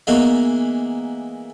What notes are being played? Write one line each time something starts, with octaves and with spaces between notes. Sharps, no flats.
E3 G#3 A#3 B3 D#4